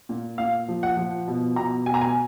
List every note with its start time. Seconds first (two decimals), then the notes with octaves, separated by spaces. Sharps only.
0.09 A#2
0.38 A#2 F5
0.68 F3
0.83 F#5
0.97 F3
1.28 B2
1.56 B2 A#5
1.86 B2 G#5
1.94 A#5
2.01 G#5